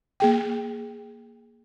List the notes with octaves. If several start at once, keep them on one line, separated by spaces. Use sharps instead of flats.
A#3 G#4 G5